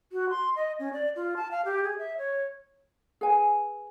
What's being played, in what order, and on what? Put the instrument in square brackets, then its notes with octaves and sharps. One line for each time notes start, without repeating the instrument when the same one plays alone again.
[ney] F#4
C6
D#5
C#4
D5
F4
A5
F5
G4
G#4
E5
C#5
[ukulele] G#4 B4 G#5